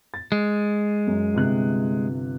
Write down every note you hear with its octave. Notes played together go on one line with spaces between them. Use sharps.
A6
G#3
F#2
G1 C3 F#6